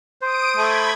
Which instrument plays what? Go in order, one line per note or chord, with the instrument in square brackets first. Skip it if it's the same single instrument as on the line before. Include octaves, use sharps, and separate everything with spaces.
[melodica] C5 [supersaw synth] D#6 D7 D#7
[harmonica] A3 [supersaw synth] B5 G#6